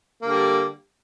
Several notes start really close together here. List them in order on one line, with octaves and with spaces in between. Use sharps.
A#3 D3 G3